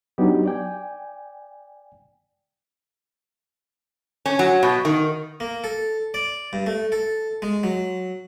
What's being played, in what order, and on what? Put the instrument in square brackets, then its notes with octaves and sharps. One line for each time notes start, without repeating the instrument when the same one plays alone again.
[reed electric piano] F#3 B3 D4 D#4 F#4 G4
D5 G5 G#5
[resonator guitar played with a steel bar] C#4
F#3
B2
D#3
[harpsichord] A#3
A4
D5
G2
A3
A4
G#3
F#3